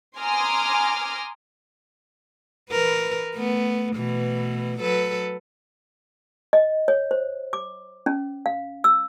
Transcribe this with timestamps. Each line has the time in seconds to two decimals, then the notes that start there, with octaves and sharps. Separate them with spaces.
0.18 G#5 A#5 C6 D6 D#6 F6
2.70 E3 A#4 B4
3.34 A3 B3
3.96 B2 E3 A3
4.80 F#3 A4 B4
6.53 D#5
6.88 C#5
7.11 C5
7.53 D6
8.06 C#4
8.46 F5
8.84 E6